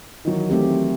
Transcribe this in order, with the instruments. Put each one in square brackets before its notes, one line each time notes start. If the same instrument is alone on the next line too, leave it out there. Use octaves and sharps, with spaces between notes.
[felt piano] D#3 E3 F#3
[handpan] A3 C4 G4